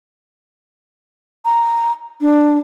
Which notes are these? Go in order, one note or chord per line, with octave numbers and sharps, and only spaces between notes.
A#5
D4